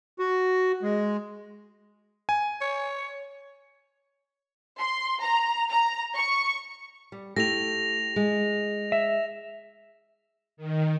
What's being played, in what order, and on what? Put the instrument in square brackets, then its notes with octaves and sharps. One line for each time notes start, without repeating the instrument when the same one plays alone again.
[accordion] F#4
G#3
[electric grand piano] G#5
[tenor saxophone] C#5
[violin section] C6
A#5
A#5
C#6
[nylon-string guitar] G3
[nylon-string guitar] A3 E4 [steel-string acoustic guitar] G4 [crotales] A#6 F7
[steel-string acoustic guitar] G#3
[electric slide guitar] E5
[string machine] D#3